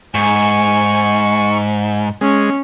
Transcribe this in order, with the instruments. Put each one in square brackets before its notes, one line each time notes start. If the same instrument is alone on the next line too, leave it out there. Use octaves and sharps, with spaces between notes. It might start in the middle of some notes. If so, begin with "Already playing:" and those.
[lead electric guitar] G#2 [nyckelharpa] G#5 [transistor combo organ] C#6
[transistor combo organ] G#3 [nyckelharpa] C#4